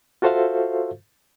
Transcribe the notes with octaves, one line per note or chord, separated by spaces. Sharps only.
F4 F#4 A4 C5 E5 F5